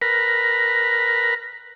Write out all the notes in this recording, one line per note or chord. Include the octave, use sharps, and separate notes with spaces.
A#4 B4